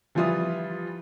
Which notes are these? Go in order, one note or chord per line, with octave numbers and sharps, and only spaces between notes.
E3 F3 G3 F4 E5 D#6